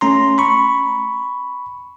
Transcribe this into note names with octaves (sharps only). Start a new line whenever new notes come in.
A3 C#4 A#5 C6
B5 C#6